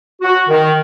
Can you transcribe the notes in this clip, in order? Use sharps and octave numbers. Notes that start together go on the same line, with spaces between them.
F#4
D#3